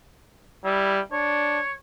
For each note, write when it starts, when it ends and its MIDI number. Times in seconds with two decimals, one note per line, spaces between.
0.65 1.00 55
0.65 0.98 64
1.12 1.60 62
1.12 1.73 73